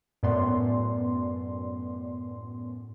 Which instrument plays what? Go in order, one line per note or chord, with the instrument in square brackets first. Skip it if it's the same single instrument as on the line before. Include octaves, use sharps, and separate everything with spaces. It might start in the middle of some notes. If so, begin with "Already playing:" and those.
[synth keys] F#2 A2 B3 D5 C6